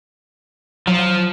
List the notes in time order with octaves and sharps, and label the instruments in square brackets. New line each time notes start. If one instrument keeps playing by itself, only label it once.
[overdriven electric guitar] F3 [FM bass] F#3